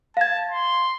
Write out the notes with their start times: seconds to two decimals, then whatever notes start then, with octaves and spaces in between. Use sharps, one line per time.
0.17 F5 A5 G#6
0.51 C6